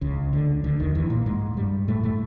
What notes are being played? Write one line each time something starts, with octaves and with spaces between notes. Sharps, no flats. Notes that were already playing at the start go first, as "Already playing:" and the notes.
C#2 C#3
D2 D3
D2 D3
D#2 D#3
E2 E3
A#2 A#3
G#2 G#3
G2 G3
A2 A3
A2 A3